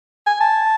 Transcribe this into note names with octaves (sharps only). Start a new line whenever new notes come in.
G#5
A5